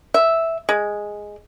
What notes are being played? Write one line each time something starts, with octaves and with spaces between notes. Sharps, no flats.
E5
G#3